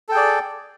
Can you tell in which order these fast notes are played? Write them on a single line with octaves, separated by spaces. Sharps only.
A4 G5 G#4 D5